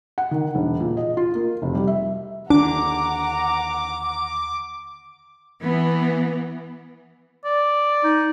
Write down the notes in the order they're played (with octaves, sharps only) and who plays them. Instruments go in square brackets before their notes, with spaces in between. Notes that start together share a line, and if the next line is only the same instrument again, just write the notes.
[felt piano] F#5
D#3
E1
A#2
D#5
F4
A#3
F1
G3
E5
[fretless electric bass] D#2 D3 [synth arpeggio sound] D4 [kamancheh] F#5 A#5 [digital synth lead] D6
[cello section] E3 B3
[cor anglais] D5
[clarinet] D#4